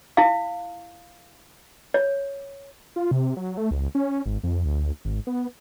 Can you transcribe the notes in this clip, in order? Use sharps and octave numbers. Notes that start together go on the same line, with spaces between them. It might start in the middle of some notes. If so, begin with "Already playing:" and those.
E4 F5
C#5
F4
C3
F#3
A3
C#2
C#4
G#1
F2
D2
G#1
B3